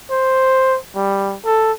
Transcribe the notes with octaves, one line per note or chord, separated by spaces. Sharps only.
C5
G3
A4